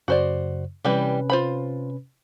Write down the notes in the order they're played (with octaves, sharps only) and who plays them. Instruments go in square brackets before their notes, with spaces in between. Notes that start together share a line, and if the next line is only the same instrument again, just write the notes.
[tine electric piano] F#2 C#3 [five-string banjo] F#4 C5 D5
[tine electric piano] C3 C#4 B4 [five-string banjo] E3 G3 G4
[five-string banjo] F4 C5 B5